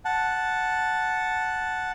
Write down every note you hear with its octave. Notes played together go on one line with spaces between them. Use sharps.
F#5 A5